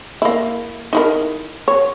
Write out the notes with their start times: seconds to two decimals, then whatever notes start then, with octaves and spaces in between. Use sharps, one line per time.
0.22 A#3 E4
0.93 D#4 E4 A#4
1.68 C#5